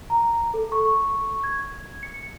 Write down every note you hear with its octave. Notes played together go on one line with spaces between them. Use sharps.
A#5
A4
C#6
G#6
C#7